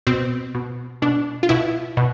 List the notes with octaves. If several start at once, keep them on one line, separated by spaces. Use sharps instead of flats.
B2 C4
B2
B2 D4
F4
B2 E4
B2